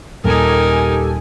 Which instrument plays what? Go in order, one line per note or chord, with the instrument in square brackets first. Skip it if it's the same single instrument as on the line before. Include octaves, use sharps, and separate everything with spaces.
[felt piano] D#1 [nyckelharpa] D#4 A#4 [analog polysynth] G4 A4 G#5